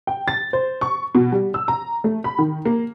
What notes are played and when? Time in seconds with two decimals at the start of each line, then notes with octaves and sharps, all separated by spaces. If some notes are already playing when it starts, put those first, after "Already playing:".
0.07 G5
0.28 A6
0.53 C5
0.81 C#6
1.15 B2
1.32 G3
1.54 E6
1.68 A#5
2.04 A3
2.24 B5
2.39 D#3
2.65 A#3